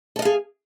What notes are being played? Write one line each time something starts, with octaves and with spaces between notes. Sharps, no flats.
G#4 A4 D#5 F5